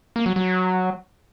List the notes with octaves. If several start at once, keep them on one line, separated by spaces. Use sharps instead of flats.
A#3
F#3
F#3